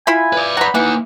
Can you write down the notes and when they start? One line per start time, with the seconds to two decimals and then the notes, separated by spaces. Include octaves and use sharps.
0.07 E4 F4 G#5 B5
0.33 B4 D5
0.57 F#5 A#5 B5
0.75 E3 A#3 D#4 F#5